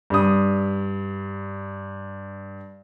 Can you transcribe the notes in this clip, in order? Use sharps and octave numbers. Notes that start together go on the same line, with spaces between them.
G2 D#6